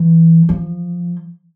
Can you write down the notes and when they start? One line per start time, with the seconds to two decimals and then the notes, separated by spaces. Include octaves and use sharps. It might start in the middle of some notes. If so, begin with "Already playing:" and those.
Already playing: E3
0.49 F3